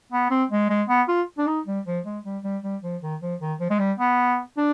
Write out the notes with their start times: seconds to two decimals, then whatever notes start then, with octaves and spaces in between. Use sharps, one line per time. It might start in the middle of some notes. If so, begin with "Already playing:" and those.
0.12 B3
0.30 C4
0.51 G#3
0.70 G#3
0.89 B3
1.08 F4
1.38 D4
1.47 D#4
1.66 G3
1.86 F3
2.05 G#3
2.24 G3
2.44 G3
2.63 G3
2.82 F3
3.02 D#3
3.21 F3
3.40 D#3
3.60 F3
3.70 G#3
3.79 G3
3.99 B3
4.57 D4